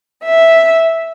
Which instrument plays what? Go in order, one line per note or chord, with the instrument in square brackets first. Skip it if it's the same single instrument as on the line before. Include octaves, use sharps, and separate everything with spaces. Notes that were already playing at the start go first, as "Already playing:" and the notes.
[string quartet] E5